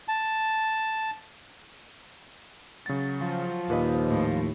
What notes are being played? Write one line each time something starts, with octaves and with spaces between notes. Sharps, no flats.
A5
C#3 F#3 A6
F3
D#2 A#2 B4 D#5
A2